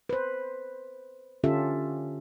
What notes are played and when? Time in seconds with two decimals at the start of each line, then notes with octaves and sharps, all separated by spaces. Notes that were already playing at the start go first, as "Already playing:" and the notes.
0.09 B4 C5
1.44 D3 C#4 F4 G4 A4 E5